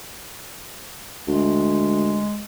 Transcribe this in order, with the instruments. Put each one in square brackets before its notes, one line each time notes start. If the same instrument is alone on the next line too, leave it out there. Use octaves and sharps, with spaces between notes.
[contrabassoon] D2 [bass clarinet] G#3